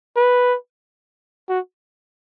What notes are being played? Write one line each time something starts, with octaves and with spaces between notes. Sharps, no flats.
B4
F#4